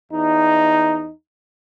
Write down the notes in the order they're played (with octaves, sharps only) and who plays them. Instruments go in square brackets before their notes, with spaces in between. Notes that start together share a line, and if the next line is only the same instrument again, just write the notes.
[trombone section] E2 D#4